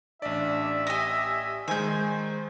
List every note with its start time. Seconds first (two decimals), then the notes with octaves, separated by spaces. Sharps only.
0.22 A1 D4 D5 E5
0.87 G4 D#5 G#5
1.68 D#3 G#3 C5 G#5 G6